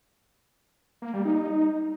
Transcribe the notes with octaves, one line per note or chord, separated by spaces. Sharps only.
A#3
G3
D#4